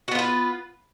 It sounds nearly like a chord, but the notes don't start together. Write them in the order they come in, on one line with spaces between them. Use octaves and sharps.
F#4 B3 F4 B4